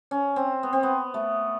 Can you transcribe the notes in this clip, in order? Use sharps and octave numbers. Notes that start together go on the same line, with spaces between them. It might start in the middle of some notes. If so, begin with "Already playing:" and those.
C#4
C4
B3
C4
B3
A3